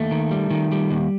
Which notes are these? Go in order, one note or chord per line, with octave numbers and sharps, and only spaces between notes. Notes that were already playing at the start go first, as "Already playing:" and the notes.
Already playing: D#2 A3
D#3
G3
D#3
G3
D#2